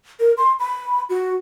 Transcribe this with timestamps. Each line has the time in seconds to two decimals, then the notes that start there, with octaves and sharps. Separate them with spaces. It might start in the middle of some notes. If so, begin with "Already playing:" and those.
0.20 A#4
0.38 C6
0.60 B5
1.09 F#4